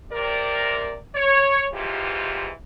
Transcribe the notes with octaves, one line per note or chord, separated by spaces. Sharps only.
C3 A#4 D5
C#5
E2 G#2 E3 F4 G4